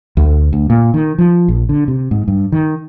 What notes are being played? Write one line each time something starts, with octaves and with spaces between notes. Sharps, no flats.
D2
D2
A#2
D#3
F3
A#1
D3
C3
G#2
G2
D#3